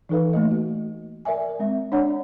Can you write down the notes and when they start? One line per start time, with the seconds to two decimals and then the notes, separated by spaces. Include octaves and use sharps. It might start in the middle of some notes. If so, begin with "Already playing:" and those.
0.09 E3 D#4 A4 B4 F5
0.33 A3 A#3 D#5
0.51 F#4
1.25 A#4 D5 E5 G#5
1.59 G#3 C4 E5
1.92 D4 C#5 D5 F#5 A#5